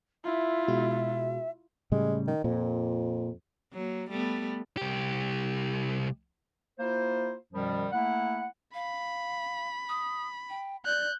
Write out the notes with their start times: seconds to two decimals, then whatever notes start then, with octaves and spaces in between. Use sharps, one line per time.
0.25 E4 F4 E5
0.68 B2 G#3 F#4
1.92 A2 C#3 G3 G#3
2.27 D#3
2.44 F2 A#2
3.73 F#3 A#3
4.10 G3 A3 B3
4.77 C2 G4
6.80 A#3 E4 F4 C5
7.53 F#2 B2 D#3 F3 G3
7.92 A3 A#3 E4 F#5
8.74 F5 B5
9.89 D#6
10.50 G5
10.85 D5 F#6 G6